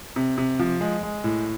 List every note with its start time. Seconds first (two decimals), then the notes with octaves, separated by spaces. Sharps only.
0.16 C3
0.38 C3
0.59 F3
0.81 G#3
1.03 G#3
1.24 A2